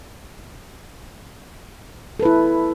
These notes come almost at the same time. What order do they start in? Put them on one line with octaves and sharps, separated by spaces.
A4 B4 E4